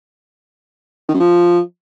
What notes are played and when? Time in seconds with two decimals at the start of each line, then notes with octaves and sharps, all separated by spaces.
1.09 D#3
1.14 F#2
1.20 F3